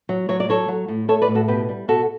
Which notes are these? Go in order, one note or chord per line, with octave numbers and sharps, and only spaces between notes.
F#3
F#3 C#5
D5
F#3 A4 C#5
F#3
A2
A2 A4 C#5
B4 D5
A2
F#4 A4
B2 G4 B4
G3
B2 F#4 A4